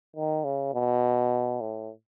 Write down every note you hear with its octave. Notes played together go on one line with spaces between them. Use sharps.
D#3
C#3
B2
A2